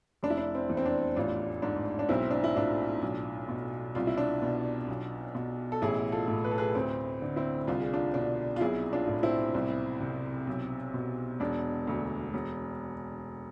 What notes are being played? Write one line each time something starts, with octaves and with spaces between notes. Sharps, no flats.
F1 D4
E4
D4
C4
E2
C4
D4
A1 D4 F4
G#2 D4
D4
B1 C4 E4
D4
E4
A2 D4 F4
B1
B2
C2 F4
E4
D4 F4
B2
B1
B2
A4
A1 E4 G#4
F4 A4
A2
B4
A4
G#4 B4
D2 C4
D3
C4 E4
C2 F4
G#4
D4 F4
B2 D4
F4
B1 E4 G#4
D4 F4
A2
C4 E4
C2
C3
B1
B2
E1 D4
D2
E1